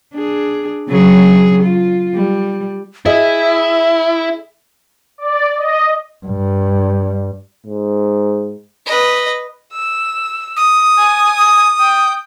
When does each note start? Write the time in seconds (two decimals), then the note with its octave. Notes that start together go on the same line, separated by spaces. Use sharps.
0.14 D4 G#4
0.88 C#3 F#3 G#4
1.63 F4
2.15 G3
3.06 E4 G#4 D#5 E5
5.18 D5
5.58 D#5
6.26 G2
7.67 G#2
8.86 B4 D#5
9.72 E6
10.57 D#6
10.98 G#5
11.81 G5